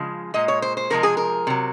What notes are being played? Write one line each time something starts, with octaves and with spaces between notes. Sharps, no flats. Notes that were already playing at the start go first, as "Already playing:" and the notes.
Already playing: C#3 F3 G#3
A#2 G#3 D#5
C#5
C5
C5
C3 F3 G#3 A#4
G#4
A#4
C3 F#3